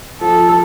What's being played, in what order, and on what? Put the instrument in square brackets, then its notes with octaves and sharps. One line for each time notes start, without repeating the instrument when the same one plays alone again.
[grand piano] F3 [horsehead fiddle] A4